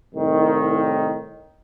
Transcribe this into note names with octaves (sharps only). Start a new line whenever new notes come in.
C2 A2 D#3